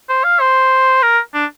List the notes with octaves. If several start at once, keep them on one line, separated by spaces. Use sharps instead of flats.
C5
F5
C5
A#4
D4